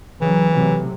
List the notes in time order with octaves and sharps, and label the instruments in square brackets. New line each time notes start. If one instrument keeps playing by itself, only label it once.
[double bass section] C#3 F#3 [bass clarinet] E3
[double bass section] A2 C3 F#3